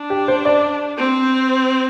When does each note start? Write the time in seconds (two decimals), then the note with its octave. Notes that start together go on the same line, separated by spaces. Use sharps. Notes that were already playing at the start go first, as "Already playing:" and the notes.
Already playing: D4
0.10 G4
0.28 C5
0.45 D5
0.97 C4